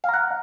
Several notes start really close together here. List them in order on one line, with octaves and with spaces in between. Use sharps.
F5 A#5 F#5